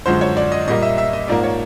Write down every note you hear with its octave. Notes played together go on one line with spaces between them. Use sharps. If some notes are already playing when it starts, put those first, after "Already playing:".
F#2 D3 F3 G#3 C5
C#5
D5
D#5
A#2 G3 A#3 D#5
E5
E5
D#5
G#2 F3 A#3 D5
C#5